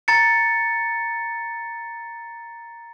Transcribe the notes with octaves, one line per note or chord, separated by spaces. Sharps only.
A#5 A6 C#7